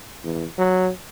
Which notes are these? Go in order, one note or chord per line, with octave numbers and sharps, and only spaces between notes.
E2
F#3